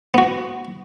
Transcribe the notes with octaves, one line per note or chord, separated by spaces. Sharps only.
B3 F#4